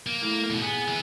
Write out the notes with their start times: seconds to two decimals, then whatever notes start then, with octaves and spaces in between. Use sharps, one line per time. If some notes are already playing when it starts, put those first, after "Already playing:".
0.07 A#3
0.23 A2 A#3
0.50 D#2 B2
0.62 B3 G#4
0.88 E3 B4